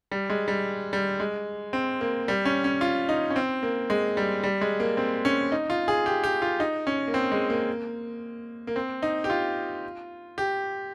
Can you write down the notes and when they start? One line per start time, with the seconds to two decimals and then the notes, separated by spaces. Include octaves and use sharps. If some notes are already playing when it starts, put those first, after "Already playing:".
0.12 G3
0.30 G#3
0.48 G3
0.93 G3
1.20 G#3
1.73 C4
2.01 A#3
2.28 G3
2.45 C#4
2.64 C#4
2.81 F4
3.09 D#4
3.31 C#4
3.36 C4
3.63 A#3
3.90 G#3
4.17 G3
4.44 G3
4.61 G#3
4.80 A#3
4.97 C4
5.25 C#4
5.52 D#4
5.70 F4
5.88 G#4
6.06 G4
6.24 G4
6.42 F4
6.60 D#4
6.87 C#4
7.08 A#3
7.14 C4
7.32 G#3
7.50 A#3
8.67 A#3
8.76 C4
9.02 D#4
9.24 G4
9.30 F4
10.38 G4